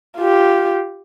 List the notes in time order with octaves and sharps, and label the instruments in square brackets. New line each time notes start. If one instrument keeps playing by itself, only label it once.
[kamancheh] F4 G4